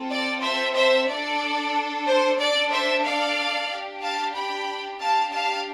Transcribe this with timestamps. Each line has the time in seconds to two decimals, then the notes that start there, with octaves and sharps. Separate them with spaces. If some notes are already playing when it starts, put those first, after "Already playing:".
Already playing: C4 F4 A4
0.10 D5
0.42 C5 E5
0.75 C5 E5
1.08 D4 A4 D5
2.06 C5
2.38 D4 A4 D5
2.71 C5 E5
3.04 D5 F5
3.69 D4 G4
4.02 F5 A5
4.34 G5 B5
5.01 D4 G4 F5 A5
5.33 F5 A5